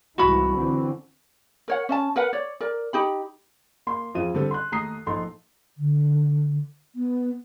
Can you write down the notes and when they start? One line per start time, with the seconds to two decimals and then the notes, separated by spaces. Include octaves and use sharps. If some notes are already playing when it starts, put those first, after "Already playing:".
0.18 C2 G#2 E3 F#4 B5
0.56 D3 E3 C4
1.68 A#4 C#5 F#5
1.89 C#4 D#5 A5
2.16 A#4 B4 F#5
2.33 C#5 D5
2.61 A#4 D5
2.93 D#4 G4 B5
3.87 A#3 C6
4.15 F2 F4 G#4 D#7
4.34 D3 G3 C4 A4
4.51 C6 F#6
4.72 D#2 A3 A#5 D#6 C7
5.06 A#1 D#4 A4 C6
5.78 D3
6.95 B3